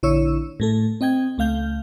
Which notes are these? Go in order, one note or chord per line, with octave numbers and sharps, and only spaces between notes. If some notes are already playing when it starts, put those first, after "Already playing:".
A#1 D3 E4 C#5 C#6 E6
A2 A3 A4
C4 D#5 G5 G#6
C#2 A3 F5 G6